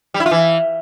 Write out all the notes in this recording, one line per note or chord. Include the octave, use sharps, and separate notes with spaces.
G3
E4
F4
E3